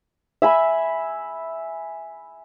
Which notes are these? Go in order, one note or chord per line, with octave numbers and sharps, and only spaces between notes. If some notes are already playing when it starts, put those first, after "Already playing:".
E5 G#5 B5